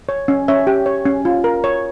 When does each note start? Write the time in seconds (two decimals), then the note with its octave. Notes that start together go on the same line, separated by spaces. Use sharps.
0.09 C#5
0.28 C#4
0.48 C#4 C#5 E5
0.67 G4
0.86 C#5
1.06 C#4
1.25 F4
1.44 A#4
1.64 C#5